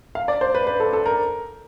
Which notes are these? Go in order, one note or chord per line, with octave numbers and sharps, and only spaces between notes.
F5
D5
C5
B4
B4
A4
A4
A#4